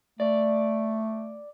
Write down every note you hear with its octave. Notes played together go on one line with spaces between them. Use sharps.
A3 D5